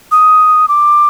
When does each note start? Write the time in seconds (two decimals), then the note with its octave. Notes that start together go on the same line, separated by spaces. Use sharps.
0.12 D#6
0.68 D6